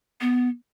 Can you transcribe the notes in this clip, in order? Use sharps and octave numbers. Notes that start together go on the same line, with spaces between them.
B3